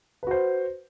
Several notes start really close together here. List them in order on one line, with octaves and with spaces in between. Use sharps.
B4 F#4 C5